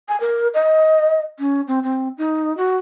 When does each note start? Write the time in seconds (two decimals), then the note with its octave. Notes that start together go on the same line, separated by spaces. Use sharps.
0.09 G#5
0.21 A#4
0.54 D#5
1.39 C#4
1.68 C4
1.83 C4
2.18 D#4
2.57 F#4